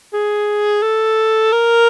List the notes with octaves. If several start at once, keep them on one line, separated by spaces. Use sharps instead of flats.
G#4
A4
A#4